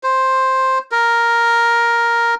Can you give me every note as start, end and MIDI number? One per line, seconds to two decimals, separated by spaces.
0.03 0.78 72
0.92 2.34 70